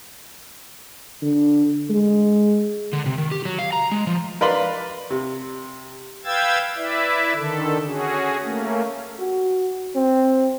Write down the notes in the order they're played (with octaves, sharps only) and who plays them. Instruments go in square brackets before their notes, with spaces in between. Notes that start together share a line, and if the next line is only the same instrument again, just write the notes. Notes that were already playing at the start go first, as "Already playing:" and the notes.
[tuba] D3
G#3
[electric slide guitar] D3
C3
D#3
G4
F#3
F5
A#5
G#3
F3
[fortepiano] A#4 B4 D5 F5 B5 C6
C3
[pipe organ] B4 F5 G5 E6 G#6 A6
E4 B4 D5 E5
D3 D#3 A4
C#4 F#4 G#4
A3 A#3 C#4
[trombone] F#4
C4